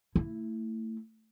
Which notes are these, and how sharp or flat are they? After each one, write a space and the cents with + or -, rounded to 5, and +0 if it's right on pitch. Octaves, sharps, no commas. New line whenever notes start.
A3 +30 E4 +0